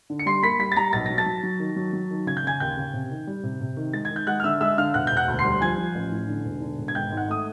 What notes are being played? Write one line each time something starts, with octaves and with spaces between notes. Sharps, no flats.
D3
C#7
G3 C6 C7
A#3 B5 B6
G3 B5 B6
A6
G3 A#5 A#6
B1 A6
F#3 A#6
A5 A6
F#3
F#3
D#3
F#3
F#3
D#3
C#3 G#6
G6
C#3 G#5 G#6
D#2 G5 G6
C#3
C3
D#3
G3
C3
C3
D#3
G#3 A6
G#6
D#3
G6
G#3 F#5 F#6
F6
D3 E5 E6
G#3 E5 E6
D3 F5 F6
E1 F#5 F#6
E1 G6
F#5 F#6
D2
C6 C7
G3
F3 G#5 G#6
F3
A1
A2
D3
E1
D3
E1
G#6
G#1 G5 G6
G#2
F#5 F#6
A3 D#6